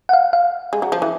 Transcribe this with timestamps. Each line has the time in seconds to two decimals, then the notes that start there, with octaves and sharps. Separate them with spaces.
0.09 F#5
0.13 F5
0.33 F5
0.73 G#3
0.82 F#3
0.92 F3
1.02 E3